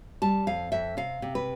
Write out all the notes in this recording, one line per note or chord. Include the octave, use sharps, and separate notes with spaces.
G3 A5
F2 F5
F2 E5
C3 F5
C3
B4